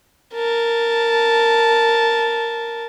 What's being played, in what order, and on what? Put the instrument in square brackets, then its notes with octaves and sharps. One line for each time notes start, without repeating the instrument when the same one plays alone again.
[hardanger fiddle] A#4 A5